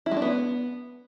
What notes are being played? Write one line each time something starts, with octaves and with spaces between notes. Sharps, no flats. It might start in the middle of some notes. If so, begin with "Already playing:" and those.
E4
G#3
D4
B3